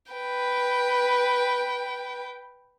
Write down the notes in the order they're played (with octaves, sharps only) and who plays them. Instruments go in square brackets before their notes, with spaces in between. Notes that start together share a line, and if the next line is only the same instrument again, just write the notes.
[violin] B4 G5